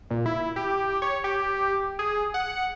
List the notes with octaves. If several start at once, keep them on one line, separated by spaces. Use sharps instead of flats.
A#2
E4
G4
C#5
G4
G#4
F#5